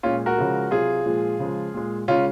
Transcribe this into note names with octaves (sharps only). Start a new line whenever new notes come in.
A#2 G#3 C#4 F4
F#4 A#4
C#3 F3 G#3
C3 F#3 F4 G#4
A#2 F3 G#3
C#3 F3 G#3
A#2 G#3
C#3 G#3 C#4 F4